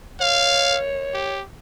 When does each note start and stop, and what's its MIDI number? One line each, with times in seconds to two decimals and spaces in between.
0.20 1.38 73
0.20 0.78 77
1.14 1.43 67